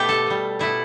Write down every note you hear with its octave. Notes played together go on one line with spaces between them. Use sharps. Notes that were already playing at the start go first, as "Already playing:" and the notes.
Already playing: B2 A3 G4
A4
B2 G3
B2 A3 E4